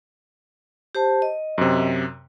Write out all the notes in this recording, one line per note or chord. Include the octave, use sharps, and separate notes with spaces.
G4 C5 A5
D#5
F#2 C3